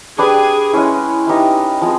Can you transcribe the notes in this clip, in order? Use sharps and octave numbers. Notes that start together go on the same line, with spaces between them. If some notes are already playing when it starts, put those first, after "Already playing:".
D4 G4 G#4 B4 D5
G#3 C#4 E4
D#4 G4 B4 E5
F3 G#3 C4